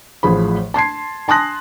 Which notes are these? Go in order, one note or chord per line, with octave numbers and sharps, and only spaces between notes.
A1 A2 F3 G#4 C5 B5
A5 C6 G#6 C7
G#5 A5 C6 D#6 F#6 A#6